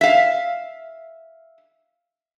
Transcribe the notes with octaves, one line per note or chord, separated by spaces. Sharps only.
E5 F5